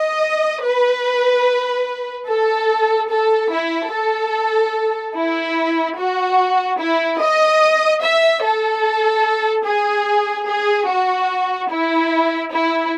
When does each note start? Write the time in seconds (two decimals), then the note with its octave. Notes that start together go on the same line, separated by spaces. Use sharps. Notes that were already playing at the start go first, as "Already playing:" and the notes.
Already playing: D#5
0.65 B4
2.29 A4
3.11 A4
3.52 E4
3.92 A4
5.15 E4
5.97 F#4
6.79 E4
7.19 D#5
8.01 E5
8.43 A4
9.65 G#4
10.47 G#4
10.88 F#4
11.69 E4
12.51 E4